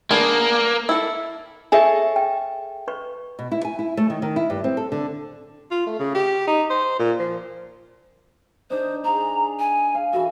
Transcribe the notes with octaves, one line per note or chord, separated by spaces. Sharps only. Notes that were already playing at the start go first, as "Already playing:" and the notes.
A#3 B3 D4 G#4
E4 A4
G#4 A4 C#5 E5 G#5
G5
B4 C#6
B2
E4
G#5
E4
A3
D#3
D#3
E4
G2
C4
A4
D3
F4
A3
C#3
G4
D#4
C5
A#2
F3
D4 D#4 C5
D4 G#4 A#5
G#5
F5
E3 F#4 A4